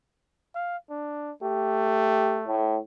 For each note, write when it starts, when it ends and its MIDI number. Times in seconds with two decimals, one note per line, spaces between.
0.55 0.77 77
0.90 1.32 62
1.42 2.65 57
1.42 2.41 67
2.46 2.77 45